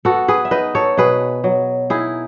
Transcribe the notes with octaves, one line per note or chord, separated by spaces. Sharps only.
B3 F#4 A4
G#4 B4
E5
D#4 B4 D#5
A4 C#5
B2 G#4 B4
F#3
D#4 E4 G#4